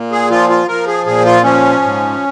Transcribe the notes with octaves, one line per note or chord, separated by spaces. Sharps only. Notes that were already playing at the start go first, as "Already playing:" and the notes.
Already playing: A#2
G#4
F3 F4
F4
F3 A#4
G#4
A#2 G#4
F4
F3 C#4
G#2